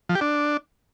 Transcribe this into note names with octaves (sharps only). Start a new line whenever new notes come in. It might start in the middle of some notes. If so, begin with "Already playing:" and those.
F3
G4
D4